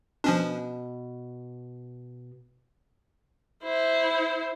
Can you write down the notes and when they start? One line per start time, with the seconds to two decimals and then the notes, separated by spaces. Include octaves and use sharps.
0.24 B2 F3 C#4 D4
3.64 E4 C5